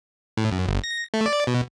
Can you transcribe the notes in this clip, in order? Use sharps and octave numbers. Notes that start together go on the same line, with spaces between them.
A2
F#2
G1
A#6
A3
D5
B2